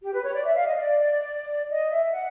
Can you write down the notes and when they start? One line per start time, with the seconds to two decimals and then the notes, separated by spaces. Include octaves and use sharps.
0.03 G4
0.13 B4
0.24 C#5
0.34 D5
0.44 E5
0.55 F5
0.66 D#5
0.76 D5
1.70 D#5
1.90 E5
2.11 F#5